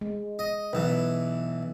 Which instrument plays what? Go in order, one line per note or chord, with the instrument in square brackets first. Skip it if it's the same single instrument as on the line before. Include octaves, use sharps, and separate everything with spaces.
[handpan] G#3
[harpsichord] D#5
[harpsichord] B1 E3 [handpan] B4